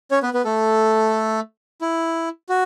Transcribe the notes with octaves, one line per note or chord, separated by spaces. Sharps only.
C#4 C#5
B3 B4
B3 B4
A3 A4
E4
F#4